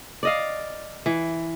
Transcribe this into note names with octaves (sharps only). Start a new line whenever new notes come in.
D5 D#5 F5
E3